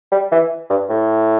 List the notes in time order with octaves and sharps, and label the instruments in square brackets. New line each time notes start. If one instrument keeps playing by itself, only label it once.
[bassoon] G3
E3
G2
A2